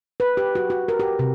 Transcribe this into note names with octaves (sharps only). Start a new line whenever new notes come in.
B4
G4
F#4
F#4
A#4
G4
C3